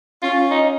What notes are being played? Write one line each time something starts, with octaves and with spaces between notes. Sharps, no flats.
C#4 F4
D#4